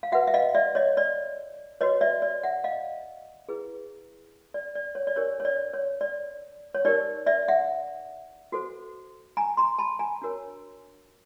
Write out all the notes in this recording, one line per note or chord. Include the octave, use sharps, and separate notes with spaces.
F5
F#4 B4 E5 F#5
E5
D#5 F5
D5 E5
C#5 D#5
D5
F#4 B4 C#5 D#5
D5 E5
D5
E5 F#5
D#5 F5
E4 G#4 B4
D5
D5
C#5
D5
D4 G4 A#4 C#5
C#5
D5
C#5
D5
C#5
D#4 G4 A#4 D5
D5 E5
E5 F#5
F#4 A4 C5
G#5 A#5
A#5 C6
A5 B5
G#5 A#5
D4 F#4 A#4 C#5